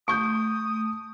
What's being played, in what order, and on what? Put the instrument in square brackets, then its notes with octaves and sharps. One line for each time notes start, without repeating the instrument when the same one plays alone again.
[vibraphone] A3 [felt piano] C#6 G6 [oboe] D#6